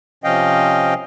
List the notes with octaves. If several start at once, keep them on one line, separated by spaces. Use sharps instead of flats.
C3 F3 C#4 D#5 F5 G5